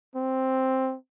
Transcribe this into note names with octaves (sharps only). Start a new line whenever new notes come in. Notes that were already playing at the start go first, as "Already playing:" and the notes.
C4